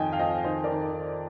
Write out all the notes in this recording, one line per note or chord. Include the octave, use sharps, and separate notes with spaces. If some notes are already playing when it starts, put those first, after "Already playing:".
Already playing: F2 D#3 D#5 G5 G#5
F5
F2 D#5 G5
D#3 C5 D#5
A#4 D5
D#3